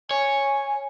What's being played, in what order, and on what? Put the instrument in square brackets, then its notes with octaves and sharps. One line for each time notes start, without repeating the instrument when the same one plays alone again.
[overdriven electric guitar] C#5 [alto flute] G#5